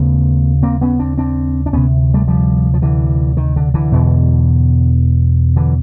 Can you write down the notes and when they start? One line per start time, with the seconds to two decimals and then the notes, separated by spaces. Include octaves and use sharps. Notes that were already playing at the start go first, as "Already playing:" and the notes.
Already playing: D#2 C#3 A3 B3
0.63 A#3 C4
0.81 B3 C#4
0.99 C4 D4
1.17 C4 D4
1.66 D4
1.73 D2 C3 B3 C#4
2.14 G3 A3
2.28 F3 G3
2.74 F3
2.82 D3 E3
3.37 D#3
3.56 D3
3.74 D3 E3
3.92 E2 B2
5.56 D3 E3